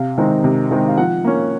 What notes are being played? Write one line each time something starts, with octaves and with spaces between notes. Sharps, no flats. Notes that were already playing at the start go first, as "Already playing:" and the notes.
Already playing: C3 F5
D#3 G#3 C4 D#4
C3
D#3 G#3 C4 D#4
F5
F3 F#5
A#3 C#4